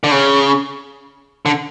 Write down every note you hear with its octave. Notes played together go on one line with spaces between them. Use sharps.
D3
C#3
D3